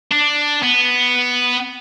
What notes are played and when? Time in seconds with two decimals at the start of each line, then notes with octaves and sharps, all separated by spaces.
0.11 D4
0.62 B3